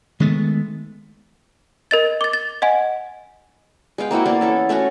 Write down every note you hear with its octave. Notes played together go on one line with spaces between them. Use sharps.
D#3 G#3 A3 B3
A#4 D#5 A6
D6 A6
A6
D#5 F#5 G#5
G#3 B3 F5 G5
A#3 C4 E4 F#4
A#3 B3 D5 F5
E3 C#4 A4
A3 C#4 E4 F#4